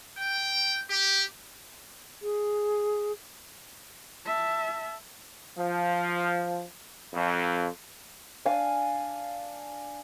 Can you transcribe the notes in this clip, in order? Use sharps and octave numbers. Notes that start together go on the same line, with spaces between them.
G5
G4
G#4
E5 A5
F3
F2
D4 F5 G#5